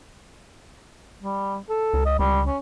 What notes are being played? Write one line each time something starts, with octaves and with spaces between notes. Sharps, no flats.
G3
A4
C#2
D#5
C#2 G3
C#4